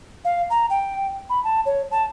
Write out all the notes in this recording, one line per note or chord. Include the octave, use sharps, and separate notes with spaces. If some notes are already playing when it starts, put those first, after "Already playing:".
F5
A#5
G5
B5
A5
C#5
A5